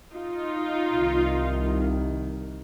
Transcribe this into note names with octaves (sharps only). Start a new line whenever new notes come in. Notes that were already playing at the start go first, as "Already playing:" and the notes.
D#4 F4
C2 D#3